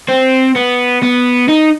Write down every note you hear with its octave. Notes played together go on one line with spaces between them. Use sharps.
C4
B3
B3
D#4